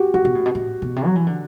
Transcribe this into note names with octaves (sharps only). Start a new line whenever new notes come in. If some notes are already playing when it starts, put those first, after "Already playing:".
Already playing: F#4 G4
F#2 F#4
B2
A2
B2
A2
B2
C3
F#3
E3
D3